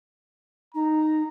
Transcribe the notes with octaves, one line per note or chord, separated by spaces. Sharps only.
D#4 A#5